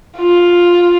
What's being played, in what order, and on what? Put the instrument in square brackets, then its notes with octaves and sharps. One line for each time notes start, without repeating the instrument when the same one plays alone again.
[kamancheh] F4